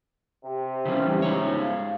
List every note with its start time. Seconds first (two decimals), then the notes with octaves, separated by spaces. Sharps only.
0.44 C3
0.85 C#3 E3 G3 C#4
1.22 G#2 D#4 C#5
1.58 F5